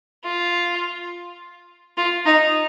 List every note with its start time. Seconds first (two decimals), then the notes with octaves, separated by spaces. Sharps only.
0.24 F4
1.97 F4
2.26 D#4